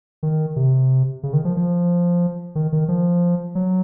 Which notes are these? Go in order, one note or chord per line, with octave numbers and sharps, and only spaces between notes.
D#3
C3
C#3
D#3
F3
F3
D#3
D#3
F3
F#3